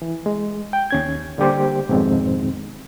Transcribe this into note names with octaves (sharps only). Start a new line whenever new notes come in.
E3
G#3
G5
D#2 C#4 G#6
D3 G3 A#3 G4 C5
F2 G#2 B2 D#3 G#3 C4